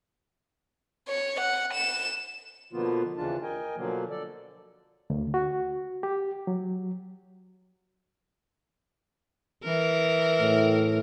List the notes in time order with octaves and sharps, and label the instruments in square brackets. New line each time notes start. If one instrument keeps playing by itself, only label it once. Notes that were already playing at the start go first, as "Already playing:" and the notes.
[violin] C#5
F#5
E7
[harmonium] B2 D3 F3 A#3 B3 F4
D#2 C#3 E3 D4 F4 A5
A#4 D#5 G5 G#5
B2 D3 F3 F#3 A#3
A4 D5
[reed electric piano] D2
F#4
G4
F#3
[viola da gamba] E3 A#4
[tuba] A2